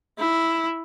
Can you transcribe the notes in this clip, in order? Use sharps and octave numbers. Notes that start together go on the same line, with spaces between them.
E4